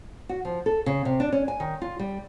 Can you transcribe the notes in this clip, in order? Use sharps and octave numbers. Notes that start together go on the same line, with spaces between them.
F#4
F3
A4
C#3
C3
D4
C#4
G#5
D#3
F4
G3